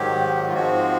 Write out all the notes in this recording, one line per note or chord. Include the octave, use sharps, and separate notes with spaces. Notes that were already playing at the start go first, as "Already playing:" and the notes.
Already playing: G#2 D#3 F#3 G4
F4
G#2 F3 G#3 C4 F#4